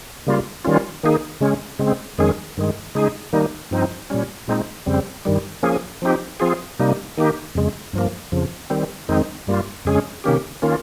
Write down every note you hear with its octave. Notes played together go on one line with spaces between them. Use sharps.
C#3 G3 A#3 F4
D#3 G3 C#4 F4
D#3 A#3 D#4 G#4
C#3 G#3 C#4
C#3 G#3 C4
F2 D#3 G#3 C#4 G#4
G2 D#3 G#3
C#3 G#3 D#4 G#4
D#3 G3 A#3 D#4
G2 F3 C4 D#4
A#2 G3 C#4
A#2 G#3 C4 D#4
F2 C#3 G3 C4
G2 D#3 G3
F3 A#3 C#4 G#4
F3 C4 D#4 G4
F3 C4 F4 G#4
C3 G3 A#3 D#4
D#3 A#3 D#4 G4
F2 C#3 G#3
G2 F3 A#3
F2 C#3 F3
D#3 G3 C4
F2 D#3 G#3 C4 D#4
G2 G3 A#3 F4
F2 C#3 G#3 C#4 G#4
C3 D#3 A#3 C#4 G4
D#3 A#3 C#4 F4